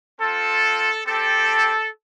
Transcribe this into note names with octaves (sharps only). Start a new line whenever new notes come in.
C4 F4 A4
C4 G4 A4